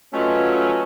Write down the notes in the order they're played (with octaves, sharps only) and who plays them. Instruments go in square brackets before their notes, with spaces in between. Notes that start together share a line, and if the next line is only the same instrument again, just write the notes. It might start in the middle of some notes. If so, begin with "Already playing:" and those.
[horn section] F#3 [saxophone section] A3 F4 [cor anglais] C#4 [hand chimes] B4 D#5 G#5